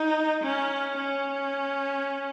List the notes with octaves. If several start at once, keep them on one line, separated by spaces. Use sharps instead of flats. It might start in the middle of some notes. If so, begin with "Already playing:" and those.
Already playing: D#4
C#4
C#4